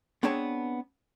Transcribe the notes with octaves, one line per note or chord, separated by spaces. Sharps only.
B3 C4 D4 G#4 C#5 A5